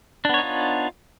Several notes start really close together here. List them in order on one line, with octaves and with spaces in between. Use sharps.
D4 B3 C#5 D#4 F4